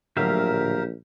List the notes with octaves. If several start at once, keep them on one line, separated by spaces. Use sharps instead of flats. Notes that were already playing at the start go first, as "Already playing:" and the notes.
A#1 A2 D3 F#3 G4 A#4 E5 F5